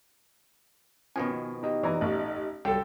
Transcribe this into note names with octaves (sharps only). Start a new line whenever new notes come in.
B2 D#3 F3 C#4 G#5
B3
D#4 G4 D#5
E3 D5 A#5
A1
C2 D3 F#3 G3 A4 G5